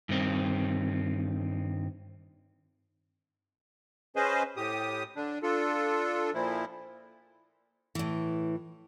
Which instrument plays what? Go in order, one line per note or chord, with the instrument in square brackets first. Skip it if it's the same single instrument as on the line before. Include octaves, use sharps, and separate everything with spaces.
[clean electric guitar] G2 D#3 C4
[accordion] C#4 G#4 B4 C5 D#5
A2 G4 D#6
D3 D4
D4 F4 A4
A#2 F3 E4
[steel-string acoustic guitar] A2 E3